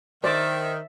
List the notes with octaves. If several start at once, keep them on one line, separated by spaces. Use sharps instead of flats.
D#3 C5 D5 E5